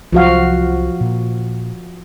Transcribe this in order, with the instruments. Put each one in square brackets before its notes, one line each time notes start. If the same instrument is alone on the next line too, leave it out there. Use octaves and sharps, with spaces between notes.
[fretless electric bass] C2 F#3 [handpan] F3 F#4 F5
[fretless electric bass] A#2